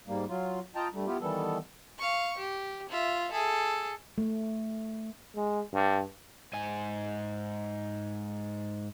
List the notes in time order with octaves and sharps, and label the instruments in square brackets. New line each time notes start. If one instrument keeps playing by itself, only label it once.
[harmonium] G#2 G3 A#3
F#3 F4
F4 D#5 G5 A5 A#5
G2 G3 A3
B3 E4 F4 G4
D#3 E3 G3 B3 A4
[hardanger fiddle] F5 C#6
G4
F4 E5
G#4 A4
[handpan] A3
[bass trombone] G#3
G2
[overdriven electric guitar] G#2 G#5